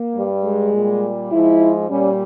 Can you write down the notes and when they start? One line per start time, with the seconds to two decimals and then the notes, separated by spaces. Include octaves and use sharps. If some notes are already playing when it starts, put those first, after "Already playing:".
Already playing: A#3
0.15 G2 G3
0.44 G#3
0.73 A#2 G3
1.32 G#2 F3 G#3 E4
1.90 A#2 G3 C#4